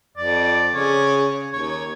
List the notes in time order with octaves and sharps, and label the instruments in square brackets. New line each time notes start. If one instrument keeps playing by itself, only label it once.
[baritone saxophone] F2 [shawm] D5
[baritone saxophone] C#3 [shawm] C#5
[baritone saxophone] D#2 [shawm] C#5